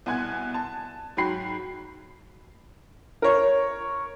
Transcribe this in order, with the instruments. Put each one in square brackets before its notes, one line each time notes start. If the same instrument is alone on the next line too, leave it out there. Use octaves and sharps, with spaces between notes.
[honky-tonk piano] C2 B2 F#5 G#5 F#6 G#6
A5
G#2 F#3 F#4 G5 B5 C7
[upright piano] A#4 C#5